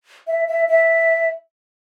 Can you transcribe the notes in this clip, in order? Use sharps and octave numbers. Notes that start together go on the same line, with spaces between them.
E5
E5
E5